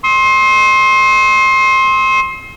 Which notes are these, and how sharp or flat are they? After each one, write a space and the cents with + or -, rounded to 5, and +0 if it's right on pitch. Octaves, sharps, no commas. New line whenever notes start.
C6 +25 E6 -45